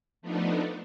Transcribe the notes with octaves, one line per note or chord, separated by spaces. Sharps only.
F3 A3 B3 D4 D#4